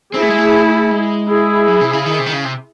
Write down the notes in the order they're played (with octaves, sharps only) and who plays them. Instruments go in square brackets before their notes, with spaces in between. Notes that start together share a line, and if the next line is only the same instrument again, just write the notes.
[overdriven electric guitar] C4 [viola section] E4 G#4
[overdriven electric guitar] A3
G#3
A3
G#3
[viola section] E4 G#4
[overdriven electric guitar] F#3
C3
C#3
D#3
C3
D#3
C#3
C3